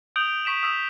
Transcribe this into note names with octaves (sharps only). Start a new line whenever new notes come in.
D#6 G6 D7 F7 G7
C#6 B6 D7 E7
D#6 E6 B6